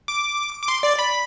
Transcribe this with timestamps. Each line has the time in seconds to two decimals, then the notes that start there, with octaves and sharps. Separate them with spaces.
0.08 D6
0.63 D6
0.68 C6
0.83 D5
0.99 B5